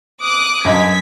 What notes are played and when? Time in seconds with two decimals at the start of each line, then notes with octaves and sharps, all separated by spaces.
0.23 D6 D#6 F#6
0.65 G1 F#2 D#5 G#5 G#6 B6